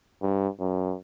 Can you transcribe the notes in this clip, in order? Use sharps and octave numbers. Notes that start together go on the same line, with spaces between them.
G2
F#2